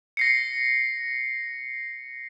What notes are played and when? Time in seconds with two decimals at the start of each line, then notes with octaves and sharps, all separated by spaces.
0.17 A#6 C7 C#7